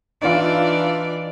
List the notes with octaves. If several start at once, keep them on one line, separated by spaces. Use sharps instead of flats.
E3 D4 D#4 F4 D5